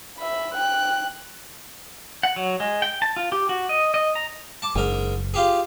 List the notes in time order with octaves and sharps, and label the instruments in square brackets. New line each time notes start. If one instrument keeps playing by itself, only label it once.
[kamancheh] E5 B5
G5 F#6
[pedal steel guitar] F#5
F#3
G#3
G5
A5
F4
G4
F#4
D#5
D#5
A#5
[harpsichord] A5 D6
[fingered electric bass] F#1 [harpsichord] G#2 A#4
[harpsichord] F4 G4 G#4